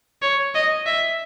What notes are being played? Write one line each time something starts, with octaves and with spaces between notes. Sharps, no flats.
C#5
D#5
E5